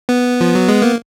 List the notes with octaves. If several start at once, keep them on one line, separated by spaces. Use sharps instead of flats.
B3
F3
F#3
G#3
A#3